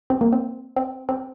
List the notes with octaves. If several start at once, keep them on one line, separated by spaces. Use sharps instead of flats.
C4
A#3
C4
C4
C4